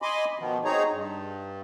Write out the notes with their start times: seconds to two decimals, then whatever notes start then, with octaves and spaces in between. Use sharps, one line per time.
0.02 D#5 G#5 B5 C6 D6
0.39 B2 D#3 F3 B3
0.65 C4 D#4 G#4 C#5 A#5
0.92 G2